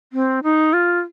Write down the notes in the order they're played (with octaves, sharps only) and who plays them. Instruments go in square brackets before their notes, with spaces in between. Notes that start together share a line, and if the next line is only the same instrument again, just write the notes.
[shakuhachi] C4
D#4
F4